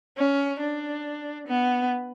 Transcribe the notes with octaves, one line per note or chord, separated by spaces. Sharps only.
C#4
D4
B3